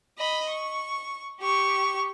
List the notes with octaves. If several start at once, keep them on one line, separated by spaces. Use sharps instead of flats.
D#5 B5
C#6
G4 C#6